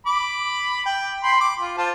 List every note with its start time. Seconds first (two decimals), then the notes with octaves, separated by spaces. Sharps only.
0.07 B5 D6
0.86 G5
1.23 G5 B5 C6
1.41 D6
1.60 F4
1.78 F4 C5 A5